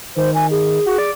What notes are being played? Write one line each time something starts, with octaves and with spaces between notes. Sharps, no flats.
D#3 C5
G#5
G#4
F#4
D5